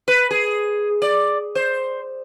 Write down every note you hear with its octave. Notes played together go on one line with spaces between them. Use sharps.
B4
G#4
D5
C5